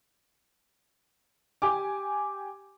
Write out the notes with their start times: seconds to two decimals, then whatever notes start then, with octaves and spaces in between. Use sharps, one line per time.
1.62 G4 G#5 D6